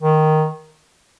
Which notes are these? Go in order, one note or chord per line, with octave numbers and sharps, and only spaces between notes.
D#3